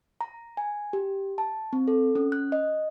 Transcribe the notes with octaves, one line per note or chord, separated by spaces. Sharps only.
A#5
G#5
G4
A5
C4
A4
C#4
F#6
D#5